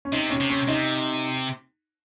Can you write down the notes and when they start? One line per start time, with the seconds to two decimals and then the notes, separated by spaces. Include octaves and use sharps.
0.05 C#4
0.12 C3 D#4
0.30 C#4
0.40 C3
0.50 C#4
0.68 C3 D#4